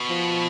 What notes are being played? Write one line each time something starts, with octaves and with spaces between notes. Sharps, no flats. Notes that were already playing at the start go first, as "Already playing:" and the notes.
Already playing: B2
F3